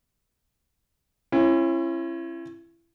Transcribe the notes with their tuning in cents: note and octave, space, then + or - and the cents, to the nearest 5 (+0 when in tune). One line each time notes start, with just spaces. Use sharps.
C#4 -35 E4 +30